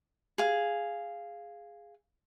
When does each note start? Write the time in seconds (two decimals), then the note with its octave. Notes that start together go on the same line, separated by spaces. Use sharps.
0.38 G#4 F5